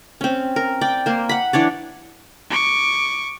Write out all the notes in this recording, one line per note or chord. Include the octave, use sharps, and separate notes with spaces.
C4 C#4
A#4
D5 G5
A#3 C5
F#5 B5
E3 D4 C#5 D5
C#6 D6